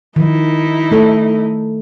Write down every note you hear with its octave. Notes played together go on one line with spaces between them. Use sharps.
D#3 F3 D#4 E4
A3 A4